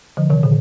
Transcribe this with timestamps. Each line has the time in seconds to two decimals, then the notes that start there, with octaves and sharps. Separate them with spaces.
0.17 D3 F3
0.30 C3 D#3
0.43 A#2 D3